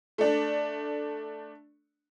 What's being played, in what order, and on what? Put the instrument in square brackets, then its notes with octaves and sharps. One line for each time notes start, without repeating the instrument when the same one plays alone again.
[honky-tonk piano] A3 D4